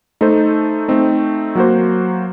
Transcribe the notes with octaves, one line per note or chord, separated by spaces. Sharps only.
A3 D#4 A4 C5
A3 C4 D#4
F#3 A#3 F#4 C5